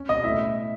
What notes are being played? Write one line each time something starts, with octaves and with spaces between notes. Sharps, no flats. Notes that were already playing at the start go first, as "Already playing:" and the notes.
Already playing: C#4
B2 D#5
A2 E5